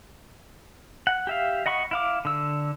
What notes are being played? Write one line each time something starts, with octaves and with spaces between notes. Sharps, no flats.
F#5
G4 E5 F5
D#5 F#5 B5 C#6
E4 F5 D6
D3 E6